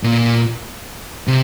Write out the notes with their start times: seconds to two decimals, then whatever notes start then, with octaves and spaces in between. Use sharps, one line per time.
0.03 A#2
1.28 C3